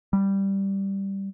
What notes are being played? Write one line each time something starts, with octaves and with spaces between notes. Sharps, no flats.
G3